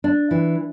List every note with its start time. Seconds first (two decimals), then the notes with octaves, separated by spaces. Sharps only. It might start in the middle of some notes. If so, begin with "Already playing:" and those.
0.04 D4
0.31 E3